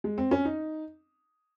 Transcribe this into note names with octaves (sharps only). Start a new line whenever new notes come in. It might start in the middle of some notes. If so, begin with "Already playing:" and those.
G#3
C4
C#4
D#4